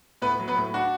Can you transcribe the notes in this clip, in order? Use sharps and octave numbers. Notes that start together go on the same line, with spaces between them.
A2 B3 B4
F#3
B3 B4
A2
D4 F#4